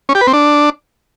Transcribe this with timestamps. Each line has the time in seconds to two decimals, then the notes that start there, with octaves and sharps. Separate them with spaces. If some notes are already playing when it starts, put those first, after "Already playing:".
0.09 C#4
0.15 G4
0.21 B4
0.27 C4
0.33 D4